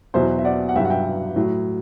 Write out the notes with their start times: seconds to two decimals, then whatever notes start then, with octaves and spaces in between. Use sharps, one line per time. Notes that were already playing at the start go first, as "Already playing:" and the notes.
0.14 E2 B2 F#3 C5 E5
0.39 E5
0.45 D5 F#5
0.69 F#5
0.75 G2 F#3 E5 G5
0.85 F#5
0.90 E5 G5
1.36 A2 F#3